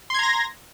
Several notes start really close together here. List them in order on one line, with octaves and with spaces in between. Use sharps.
C6 G#6 A#5 A#6